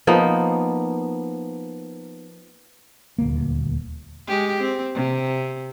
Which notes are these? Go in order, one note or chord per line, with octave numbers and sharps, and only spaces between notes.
F3 A#3 B3 D#4
D#1 D2 A#3
G#3 G4
C4
C3